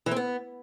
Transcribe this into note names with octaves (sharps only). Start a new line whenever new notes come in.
E3
C4
B3